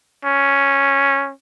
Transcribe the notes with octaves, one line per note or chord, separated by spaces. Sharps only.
C#4